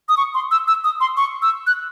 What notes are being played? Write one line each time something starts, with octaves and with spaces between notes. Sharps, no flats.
D#6
C#6
C6
E6
E6
D#6
C6
C#6
E6
F#6